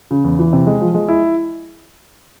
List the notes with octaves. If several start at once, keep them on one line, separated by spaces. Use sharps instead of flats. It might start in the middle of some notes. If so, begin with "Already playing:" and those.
C#3
E2
E3
C3
G#3
F3
G#3
E4